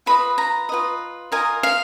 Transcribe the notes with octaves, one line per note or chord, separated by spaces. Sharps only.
F4 B4 D#5 B5
A#5
F4 B4 D#5
F4 A#4 D#5 G#5
F5